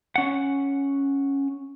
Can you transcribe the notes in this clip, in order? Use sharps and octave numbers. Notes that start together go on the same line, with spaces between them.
C#4 F#5